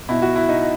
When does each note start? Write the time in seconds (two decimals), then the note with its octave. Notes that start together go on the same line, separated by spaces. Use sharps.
0.09 B2 E4
0.22 F#4
0.36 E4
0.49 D#4